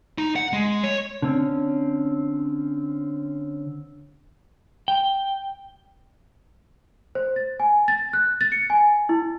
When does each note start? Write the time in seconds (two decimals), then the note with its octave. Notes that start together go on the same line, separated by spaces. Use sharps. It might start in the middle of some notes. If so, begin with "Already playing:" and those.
0.18 D#4
0.36 F#5
0.53 G#3
0.83 C#5
1.22 D3 C4 C#4
4.88 G5
7.15 C5
7.36 A6
7.60 G#5
7.88 A6
8.13 F#6
8.41 A6
8.52 C#7
8.70 G#5
9.09 E4